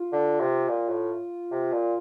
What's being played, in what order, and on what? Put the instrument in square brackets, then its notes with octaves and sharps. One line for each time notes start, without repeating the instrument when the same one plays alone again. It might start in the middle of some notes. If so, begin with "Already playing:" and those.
Already playing: [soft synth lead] F4
[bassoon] D3
C3
A#2
A2
C3
A#2